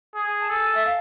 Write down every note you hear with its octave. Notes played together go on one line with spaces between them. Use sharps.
G#4
A5
A4 G#5
E5
F5